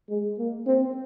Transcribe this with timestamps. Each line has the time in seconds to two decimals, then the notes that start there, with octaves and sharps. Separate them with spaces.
0.09 G#3
0.38 A#3
0.66 C4